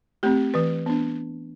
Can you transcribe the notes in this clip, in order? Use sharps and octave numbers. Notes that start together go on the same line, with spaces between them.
A3 C4 G4
E3 B4
B3 D4